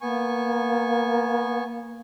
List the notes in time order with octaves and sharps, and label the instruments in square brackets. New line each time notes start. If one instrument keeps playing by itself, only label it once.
[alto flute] A#3 [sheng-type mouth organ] B3 G#5 C#6